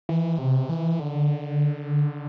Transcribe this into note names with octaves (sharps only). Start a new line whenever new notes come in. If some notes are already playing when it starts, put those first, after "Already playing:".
E3
C3
E3
D3